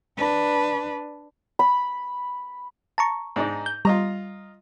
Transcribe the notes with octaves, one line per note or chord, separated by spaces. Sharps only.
D4 B4
B5
A5 A#5 C#6
G#2 D4 D#4
G6
G3 F4 D#5 A#5